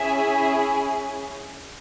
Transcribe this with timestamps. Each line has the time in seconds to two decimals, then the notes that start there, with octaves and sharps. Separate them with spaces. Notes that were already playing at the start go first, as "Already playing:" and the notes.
Already playing: C#4 E4 G#4 E5 G#5